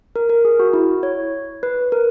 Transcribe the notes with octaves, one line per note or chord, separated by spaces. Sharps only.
A#4
A#4
G#4
F#4
E4
C#5
B4
A#4